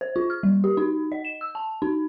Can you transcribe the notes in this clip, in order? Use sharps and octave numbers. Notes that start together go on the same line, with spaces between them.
C5
F4
F6
G3
G4
D#4
D#5
E7
E6
A5
D#4